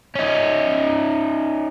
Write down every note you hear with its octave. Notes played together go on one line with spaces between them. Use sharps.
C#4 D#4